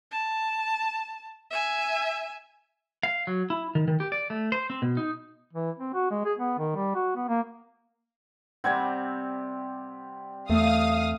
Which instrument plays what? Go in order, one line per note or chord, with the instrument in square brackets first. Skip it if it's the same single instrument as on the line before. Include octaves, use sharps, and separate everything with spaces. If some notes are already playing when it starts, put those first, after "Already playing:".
[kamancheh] A5
E5 G#5
[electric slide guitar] F5
F#3
E4
D#3
D#3
G4
D5
A3
C5
C4
B2
D#4
[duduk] E3
C4
F#4
G#3
G#4
B3
D#3
G3
F#4
B3
A#3
[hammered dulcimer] C3 G3 C4 [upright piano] F#5 G#6
[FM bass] E2 [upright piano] A3 [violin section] F5 D#6